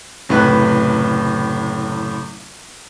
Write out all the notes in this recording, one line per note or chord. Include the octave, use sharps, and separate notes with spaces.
F#1 A2 C3 B4 F#6